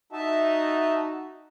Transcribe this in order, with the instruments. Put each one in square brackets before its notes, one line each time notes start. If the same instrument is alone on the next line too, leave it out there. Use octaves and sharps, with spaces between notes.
[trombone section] D#4 F#4 [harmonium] E5 A5